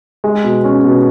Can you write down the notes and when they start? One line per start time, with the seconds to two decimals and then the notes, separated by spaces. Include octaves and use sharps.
0.24 G#3
0.44 B2
0.64 C#4
0.84 B2